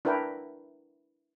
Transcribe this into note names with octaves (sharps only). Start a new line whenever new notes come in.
D4 E4 A#4 B4 G5